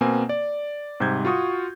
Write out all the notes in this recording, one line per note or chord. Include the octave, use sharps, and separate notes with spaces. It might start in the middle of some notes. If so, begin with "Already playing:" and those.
B2 A#3 C4 G#5
D5
G#2 C3 G3 G6 G#6
F4 F#4 C#6 D#6